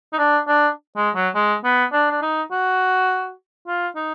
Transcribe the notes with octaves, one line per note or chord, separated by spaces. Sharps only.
D#4
D4
D4
G#3
F#3
G#3
B3
D4
D4
D#4
F#4
F4
D#4